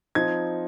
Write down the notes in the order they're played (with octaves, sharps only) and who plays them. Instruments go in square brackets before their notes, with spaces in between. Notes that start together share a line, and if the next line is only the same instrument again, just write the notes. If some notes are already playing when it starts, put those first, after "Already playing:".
[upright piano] F3 C4 D#4 G#6